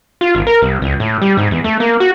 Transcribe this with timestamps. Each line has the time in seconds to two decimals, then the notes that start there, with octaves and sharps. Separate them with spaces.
0.21 F4
0.35 G#1
0.47 A#4
0.62 C2
0.82 C#2
1.00 A2
1.22 G3
1.37 G#2
1.51 E2
1.64 A3
1.80 A#3
2.00 F#4